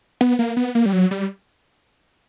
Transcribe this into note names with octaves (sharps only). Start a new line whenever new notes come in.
B3
A#3
B3
A#3
G3
F#3
G3